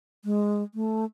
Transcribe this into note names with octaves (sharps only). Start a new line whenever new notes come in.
G#3
A3